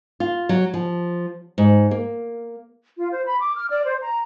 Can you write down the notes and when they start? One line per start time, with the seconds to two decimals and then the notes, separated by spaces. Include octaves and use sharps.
0.20 F4
0.49 F#3
0.74 F3
1.58 G#2
1.91 A#3
2.97 F4
3.11 C5
3.25 B5
3.38 D6
3.55 F6
3.69 D5
3.84 C5
4.03 A#5